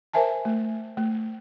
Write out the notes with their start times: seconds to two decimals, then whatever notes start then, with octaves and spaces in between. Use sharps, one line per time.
0.13 A#4 C5 E5 G#5 A5
0.45 A3
0.97 A3